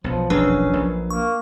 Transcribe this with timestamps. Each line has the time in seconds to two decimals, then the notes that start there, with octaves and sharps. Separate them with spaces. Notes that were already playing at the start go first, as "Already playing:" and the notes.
0.04 B1 F3 B3
0.30 E1 A#1 F2 F#3 C#4 D4 B4
0.73 A#1
1.10 A#3 C#6